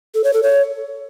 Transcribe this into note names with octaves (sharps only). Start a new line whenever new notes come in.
A4
C#5
A4
C#5